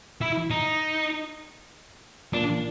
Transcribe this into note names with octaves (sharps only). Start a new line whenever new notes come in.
E4
D#4
A#2 D4